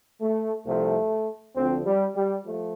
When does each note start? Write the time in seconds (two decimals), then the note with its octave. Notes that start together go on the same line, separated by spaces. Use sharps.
0.21 A3
0.65 C2 C3 F3 A3
1.55 D2 D3 F3 C4
1.85 G3
2.15 G3
2.45 F3 A3